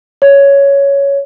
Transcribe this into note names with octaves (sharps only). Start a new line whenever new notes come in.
C#5